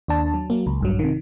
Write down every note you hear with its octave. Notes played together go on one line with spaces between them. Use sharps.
D#2 D4 A5
F#3
F#3 A#3
C#2
A#1 G2 F#3
C3 D#3